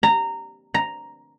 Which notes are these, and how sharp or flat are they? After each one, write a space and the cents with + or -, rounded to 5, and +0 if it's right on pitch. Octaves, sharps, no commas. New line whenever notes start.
A#5 -15
A#5 +0